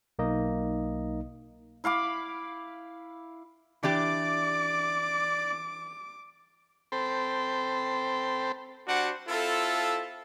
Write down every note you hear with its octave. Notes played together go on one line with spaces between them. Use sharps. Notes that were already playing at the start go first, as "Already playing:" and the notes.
B1 A#3 D#4 D#5
E4 F5 B5 D6
E3 D4 G4 D5 D6
C4 A4 C5 G5 B5
G3 D4 F#4 C5 F#5 D6
C4 E4 F4 A4